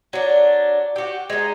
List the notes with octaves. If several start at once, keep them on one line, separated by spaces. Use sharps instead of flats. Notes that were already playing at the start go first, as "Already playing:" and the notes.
F#3 D4
F#4 G4
G#3 D#4